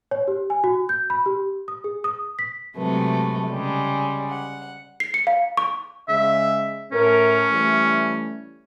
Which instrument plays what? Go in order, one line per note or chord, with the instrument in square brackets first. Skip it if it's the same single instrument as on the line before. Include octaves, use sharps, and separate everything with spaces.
[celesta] C#5
G4
G#5
F#4
G6
B5
G4
D#6
G#4
D#6
B6
[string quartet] C3 F#3 G#3 A3 B4
C#3 G3 G#3
F#5
[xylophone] C7
C#7
F5
C#6
[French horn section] C#3 G#3 [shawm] E5
[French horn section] A2 A#4 [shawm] C#4
[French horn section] E3 G3 A3